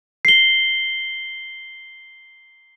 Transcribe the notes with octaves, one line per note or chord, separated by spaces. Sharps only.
C7 G7